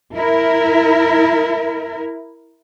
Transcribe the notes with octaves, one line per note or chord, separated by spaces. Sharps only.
E4 A#4